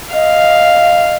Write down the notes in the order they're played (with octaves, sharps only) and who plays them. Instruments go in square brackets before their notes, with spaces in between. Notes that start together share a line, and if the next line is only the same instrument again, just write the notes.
[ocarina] D#5 [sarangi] F5